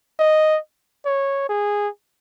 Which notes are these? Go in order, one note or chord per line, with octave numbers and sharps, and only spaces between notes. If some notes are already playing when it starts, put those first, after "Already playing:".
D#5
C#5
G#4